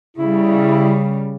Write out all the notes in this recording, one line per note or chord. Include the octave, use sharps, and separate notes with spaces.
C#3 G3 E4